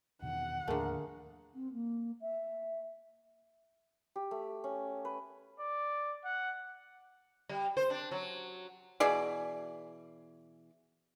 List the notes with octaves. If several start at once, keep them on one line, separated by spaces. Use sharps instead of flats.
E2 B2 D#3 F#5
D#2 A2 D3 F3 A3 G#4 A#4 F5
C4
A#3
E5
G4
A3
C#4
B4
D5
F#5
G3
C5
D4
F#3
B2 E3 G#4 D5